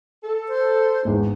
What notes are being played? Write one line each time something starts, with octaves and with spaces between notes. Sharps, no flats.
A4
C5
G#1 E2 D4